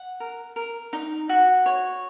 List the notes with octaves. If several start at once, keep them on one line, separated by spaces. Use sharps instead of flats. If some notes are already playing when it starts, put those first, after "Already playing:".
Already playing: F#5
A#4
A#4
D#4
F#4
C#5